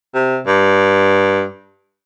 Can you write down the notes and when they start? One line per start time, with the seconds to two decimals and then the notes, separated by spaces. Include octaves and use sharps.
0.15 C3
0.47 G2